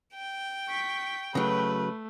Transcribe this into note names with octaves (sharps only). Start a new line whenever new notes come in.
G5
C#6 B6
C#3 F#3 A3 B4